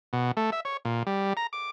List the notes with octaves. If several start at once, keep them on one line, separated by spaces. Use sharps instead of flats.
B2
A3
E5
C#5
A#2
G3
A#5
D6